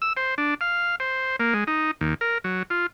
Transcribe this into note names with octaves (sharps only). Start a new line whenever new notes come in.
E6
C5
D4
F5
C5
A#3
G#3
D#4
D#2
A#4
F#3
F4